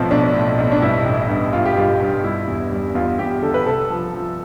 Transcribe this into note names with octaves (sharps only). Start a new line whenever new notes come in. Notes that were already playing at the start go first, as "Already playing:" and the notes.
Already playing: B1 A2 F3 B3 C4
B1 D4
A2
B1
D4
G2 E4
A1
G2
G2 F4
G4
G2 F4
G2
G3 E4
E2
G3
E2 F4
E2 G4
D3 A4
B4
C2 A4
F3
F3